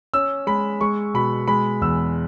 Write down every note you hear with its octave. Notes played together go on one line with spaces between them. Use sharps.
C#4 E6
G#3 B5
G#3 C#6
B2 B5
G#3 B5
E2 E6